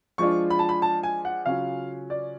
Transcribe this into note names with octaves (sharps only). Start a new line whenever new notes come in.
F3 G#3 D4 F4 C#6
B5
A5
B5
A5
G#5
F#5
C#3 F#3 C#4 F4 F5
D5